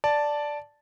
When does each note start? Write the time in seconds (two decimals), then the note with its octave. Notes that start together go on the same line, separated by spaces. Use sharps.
0.04 D5 A5